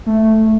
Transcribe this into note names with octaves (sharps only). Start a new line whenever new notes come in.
A3